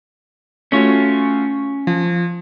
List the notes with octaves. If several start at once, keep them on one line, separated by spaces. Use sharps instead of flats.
A3 C#4 F4 F#4 C#5
F3